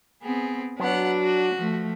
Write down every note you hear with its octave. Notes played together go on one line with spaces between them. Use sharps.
B3 C4 G#4
F#3 B3 D4 F#5
F#4
F3 A3